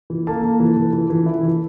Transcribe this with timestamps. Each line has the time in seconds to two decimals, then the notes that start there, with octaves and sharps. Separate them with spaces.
0.10 E3
0.27 A#3 A4 A5
0.44 A#3
0.60 E3
0.77 E3
0.93 E3
1.10 E3
1.26 E4
1.43 E3